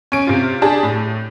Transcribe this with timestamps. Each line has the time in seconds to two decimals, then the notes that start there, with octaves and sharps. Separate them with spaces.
0.12 C#4 D7
0.27 C3 F4
0.62 D4 G4 G#4 A5
0.83 A2